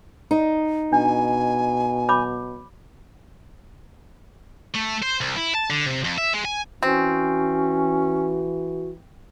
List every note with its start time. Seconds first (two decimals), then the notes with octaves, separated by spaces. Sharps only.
0.31 D#4
0.93 B2 D4 G#5
2.09 C#5 B5 D6
4.74 A3
5.02 C5
5.20 C2
5.36 E4
5.55 A5
5.70 D3
5.86 C3
6.05 F2
6.18 E5
6.34 G#3
6.45 G#5
6.83 E3 C4 C#4 F#4